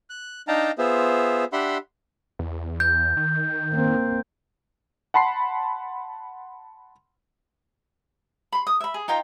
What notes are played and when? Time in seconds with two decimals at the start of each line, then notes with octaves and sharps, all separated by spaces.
0.10 F#6
0.48 D4 D#4 F5 G5 A5 A#5
0.78 B3 F4 G#4 C5 E5
1.53 D4 G4 E5 F#5 B5 C6
2.39 E2
2.80 G6
3.17 D#3
3.73 A#3 C4
5.14 F#5 A5 B5 C6 C7
8.53 B5 C6
8.67 D#6
8.80 E5 B5
8.94 G#4
9.08 D#4 F4 G5 A#5